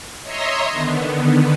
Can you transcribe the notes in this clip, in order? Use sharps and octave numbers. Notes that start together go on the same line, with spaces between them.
C#5 D#5 E5 A#5 C6
D3 D#3 B3